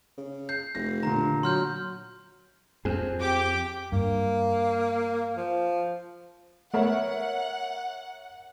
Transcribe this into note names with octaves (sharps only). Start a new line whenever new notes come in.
C#3
G6 C7
F1 A#6
A#2 D3 A#5
F#3 C6 F6 G6
F2 C4 G#4
G4 G5 D6
G2 A#3
F3
A3 B3 A#4 C#5 E5 F#5